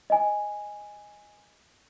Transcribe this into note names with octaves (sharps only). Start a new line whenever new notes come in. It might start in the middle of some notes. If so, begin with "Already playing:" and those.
D#5 G#5